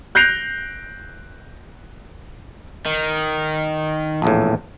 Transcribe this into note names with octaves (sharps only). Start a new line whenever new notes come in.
F#6 G6 A#6 C7 D7 F7
D#3
A#1 E2 A2